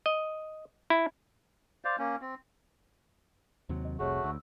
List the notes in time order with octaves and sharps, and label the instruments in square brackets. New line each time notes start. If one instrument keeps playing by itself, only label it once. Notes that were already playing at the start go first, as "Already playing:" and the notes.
[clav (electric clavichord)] D#5
E4
[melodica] C5 D5 F5
A#3 C#4
C4
[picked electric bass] D#2 C3 F#3
[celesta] D#5
[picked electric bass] F1 C2 C3 [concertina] A3 F#4 [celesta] G#4 C#5 D#5
[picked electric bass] D2 [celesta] E6